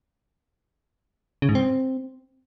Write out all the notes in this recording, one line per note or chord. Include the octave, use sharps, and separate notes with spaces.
C#3
G#2
C4